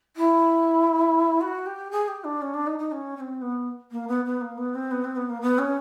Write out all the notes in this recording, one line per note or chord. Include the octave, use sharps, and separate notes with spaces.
E4
F#4
G4
G#4
G4
D4
C#4
D4
D#4
D#4
C#4
C#4
C4
B3
A#3
B3
B3
A#3
B3
C4
B3
C4
B3
A#3
B3
C#4